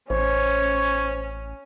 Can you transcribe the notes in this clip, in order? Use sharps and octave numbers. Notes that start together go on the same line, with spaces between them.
A1 C#4 C5 C#5